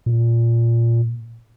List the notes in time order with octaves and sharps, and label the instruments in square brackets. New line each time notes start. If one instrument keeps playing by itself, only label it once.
[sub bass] A#2